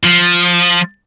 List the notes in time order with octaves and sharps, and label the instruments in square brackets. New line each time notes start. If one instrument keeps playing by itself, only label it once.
[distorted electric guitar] F3